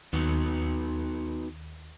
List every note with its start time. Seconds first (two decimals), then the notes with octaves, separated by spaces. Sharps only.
0.13 D#2 B3 D#4 F#4